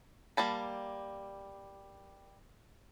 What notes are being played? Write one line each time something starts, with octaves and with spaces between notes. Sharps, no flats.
G3 A#3 A5 B5